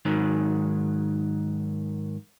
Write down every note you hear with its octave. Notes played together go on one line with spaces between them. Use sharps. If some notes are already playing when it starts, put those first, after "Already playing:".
G#2 D#3 F#3